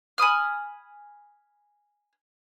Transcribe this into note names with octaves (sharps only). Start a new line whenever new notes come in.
G#5 B5 D#6 F6